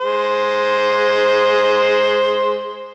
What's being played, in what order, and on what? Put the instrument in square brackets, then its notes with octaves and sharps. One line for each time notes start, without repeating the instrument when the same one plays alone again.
[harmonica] G#3 C5